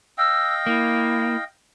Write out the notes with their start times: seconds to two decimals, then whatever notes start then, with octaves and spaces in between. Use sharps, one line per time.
0.18 D#5 F5 G5 E6
0.66 A#3 E4